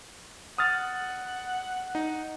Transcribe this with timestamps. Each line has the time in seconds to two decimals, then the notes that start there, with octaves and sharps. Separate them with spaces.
0.58 F#5 D#6 F6 A6
1.95 D#4